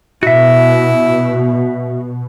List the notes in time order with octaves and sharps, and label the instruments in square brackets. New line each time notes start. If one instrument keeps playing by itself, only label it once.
[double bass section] B2 [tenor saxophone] E4 [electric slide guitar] F#4 E5